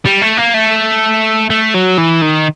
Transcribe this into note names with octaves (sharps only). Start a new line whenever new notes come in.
G3
A3
A#3
A3
A3
F#3
E3
D#3